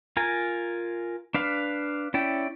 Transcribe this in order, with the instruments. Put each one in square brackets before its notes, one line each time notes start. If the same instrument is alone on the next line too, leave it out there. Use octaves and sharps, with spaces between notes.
[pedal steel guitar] F4 A#4 G#5
D4 B4 F5
C#4 E4 D5 G5